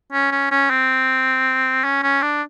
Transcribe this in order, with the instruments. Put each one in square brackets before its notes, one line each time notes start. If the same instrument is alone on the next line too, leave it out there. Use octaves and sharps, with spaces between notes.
[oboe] C#4
C#4
C#4
C4
C#4
C#4
D4